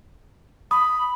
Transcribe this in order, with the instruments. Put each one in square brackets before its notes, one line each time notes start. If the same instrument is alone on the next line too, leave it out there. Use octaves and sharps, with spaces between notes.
[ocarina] B5 [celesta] D#6